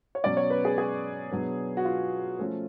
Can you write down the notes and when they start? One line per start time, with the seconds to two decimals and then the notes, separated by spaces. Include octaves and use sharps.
0.15 C#5
0.24 B2 F#3 C#4 D5
0.37 C#5
0.50 B4
0.65 G#4
0.78 G#4
1.31 B2 F#3 B3 D4
1.77 F#4
1.85 F4
2.39 F3 A3 C#4